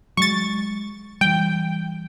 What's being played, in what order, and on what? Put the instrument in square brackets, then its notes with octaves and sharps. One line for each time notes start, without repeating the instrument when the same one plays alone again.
[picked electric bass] F#3 G#3 [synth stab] C#6 A6
[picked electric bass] E3 G3 [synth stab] G5